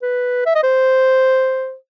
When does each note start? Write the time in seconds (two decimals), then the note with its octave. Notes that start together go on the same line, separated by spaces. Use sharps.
0.02 B4
0.46 E5
0.55 D#5
0.63 C5